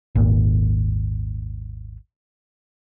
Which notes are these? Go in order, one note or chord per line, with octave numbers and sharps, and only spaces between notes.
G#1 D#2 A#2